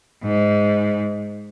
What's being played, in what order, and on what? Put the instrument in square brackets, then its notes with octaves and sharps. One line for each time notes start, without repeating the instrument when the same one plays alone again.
[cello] G#2